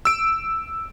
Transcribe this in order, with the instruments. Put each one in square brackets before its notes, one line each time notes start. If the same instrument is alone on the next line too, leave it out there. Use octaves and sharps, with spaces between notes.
[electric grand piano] E6 D7